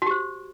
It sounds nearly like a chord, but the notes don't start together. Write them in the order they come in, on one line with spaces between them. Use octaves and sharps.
F#4 G4 C5